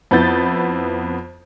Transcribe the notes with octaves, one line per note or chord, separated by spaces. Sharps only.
F2 B3 E4 G6 A6